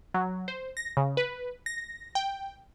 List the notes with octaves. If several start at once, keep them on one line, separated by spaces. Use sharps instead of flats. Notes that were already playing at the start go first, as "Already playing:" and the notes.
F#3
C5
A#6
C#3
B4
A#6
G5